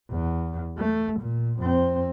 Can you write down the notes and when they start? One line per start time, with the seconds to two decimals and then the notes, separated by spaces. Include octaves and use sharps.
0.10 E2
0.78 A3
1.20 A#2
1.60 F2 C4